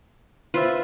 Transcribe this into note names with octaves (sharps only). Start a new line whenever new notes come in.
F4 B4 C5 E5